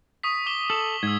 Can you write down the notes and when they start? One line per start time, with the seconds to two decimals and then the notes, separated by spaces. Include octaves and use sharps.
0.23 C#6 D#6 B6
0.46 D6 G7
0.70 A4 F#7
1.03 G#2 E6 G#6